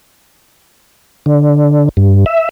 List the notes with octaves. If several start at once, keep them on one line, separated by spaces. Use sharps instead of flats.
D3
G2
E5